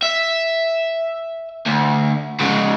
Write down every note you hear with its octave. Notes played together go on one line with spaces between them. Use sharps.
E5
D2
G#2 C#3